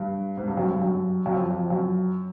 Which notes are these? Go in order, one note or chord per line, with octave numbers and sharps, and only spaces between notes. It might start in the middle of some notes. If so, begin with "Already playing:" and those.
Already playing: G2
G#2
G2
F#2
G2
F#2
F#2
F2
F2
F#2